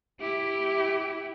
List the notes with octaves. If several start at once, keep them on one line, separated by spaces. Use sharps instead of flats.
E4 G4